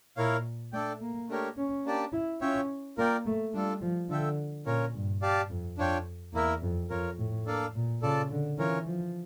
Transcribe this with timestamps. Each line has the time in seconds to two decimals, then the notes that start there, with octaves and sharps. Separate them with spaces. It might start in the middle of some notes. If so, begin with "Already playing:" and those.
0.17 A#2 E4 A#4 C#5 F5
0.72 A3 D4 A4 D5 G5
1.01 A#3
1.29 A3 D4 G4 A#4 C#5
1.57 C#4
1.85 A#3 D4 G4 D5 A5
2.13 E4
2.41 C#4 F4 C#5 E5 G5
2.98 A#3 F4 A#4 D5 G5
3.26 A3
3.53 G3 D4 F4 A4
3.81 F3
4.09 D3 F4 A4 E5 G5
4.66 A#2 C#4 F4 A#4 C#5
4.94 G2
5.22 G4 D5 F5 A5
5.50 F2
5.78 F2 D4 F4 C#5 G5
6.34 E2 A#3 E4 A#4 E5
6.62 F2
6.90 F2 F4 A#4 C#5
7.18 A2
7.46 A#3 D4 A4 D5 F5
7.75 A#2
8.02 C#3 F4 A4 D5 A5
8.31 D3
8.58 E3 C#4 F4 A#4 C#5
8.87 F3